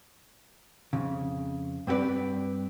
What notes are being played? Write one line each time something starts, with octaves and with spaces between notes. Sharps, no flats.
F2 C#3
G2 C4 G4 B4 D5